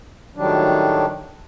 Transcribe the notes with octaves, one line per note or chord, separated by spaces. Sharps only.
A2 D#3 F#3 G3 D4